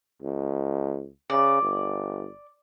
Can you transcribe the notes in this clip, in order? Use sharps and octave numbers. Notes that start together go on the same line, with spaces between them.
C#2
C#3 D5
G1